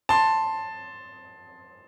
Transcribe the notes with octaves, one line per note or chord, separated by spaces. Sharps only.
A5 C6